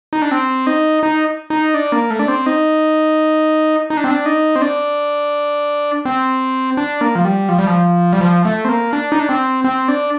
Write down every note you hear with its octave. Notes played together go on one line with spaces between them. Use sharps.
D#4
D4
C4
D#4
D#4
D#4
D4
A#3
A3
D4
C4
D#4
D#4
D4
C4
D4
D#4
C4
D4
C4
D4
A#3
F3
G3
F3
G3
F3
G3
F3
A3
C4
A#3
D4
D#4
D4
C4
C4
D4